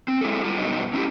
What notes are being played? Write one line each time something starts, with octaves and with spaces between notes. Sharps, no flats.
C4
G#3 E4 G#4 A4
G3 F4
G2 B2 F#3 D#4
C#4 E4 F#4 G4